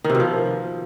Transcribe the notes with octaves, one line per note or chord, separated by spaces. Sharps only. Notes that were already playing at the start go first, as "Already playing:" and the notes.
D#3
C3
B2
F3